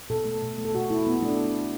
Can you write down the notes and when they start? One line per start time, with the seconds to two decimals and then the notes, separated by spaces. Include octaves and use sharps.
0.10 B2 A4
0.25 A3
0.42 B2
0.58 A3
0.65 A4
0.74 B2 F#4
0.90 A3 E4
1.06 B2 B3
1.22 A3 D4